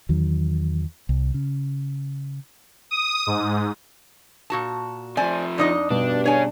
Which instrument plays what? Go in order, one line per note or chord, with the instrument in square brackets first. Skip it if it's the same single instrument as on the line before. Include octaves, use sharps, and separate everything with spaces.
[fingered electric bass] E2 D#3 F#3
C2
C#3
[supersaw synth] D#6
G#2
[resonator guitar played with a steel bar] A#2 F#4 A5
[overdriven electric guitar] C3 F3 [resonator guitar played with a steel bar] C5 D5 G#5
[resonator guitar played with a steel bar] F2 D#4 D#5 [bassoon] D4
[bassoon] G2 [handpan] B2 G3 [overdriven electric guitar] D4
[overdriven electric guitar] C#4 G#4 [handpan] D4 [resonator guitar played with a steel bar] C#5 G#5